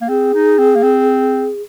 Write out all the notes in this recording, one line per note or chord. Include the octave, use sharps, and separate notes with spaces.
A#3
C4 G#4
D#4
C4
A#3
C4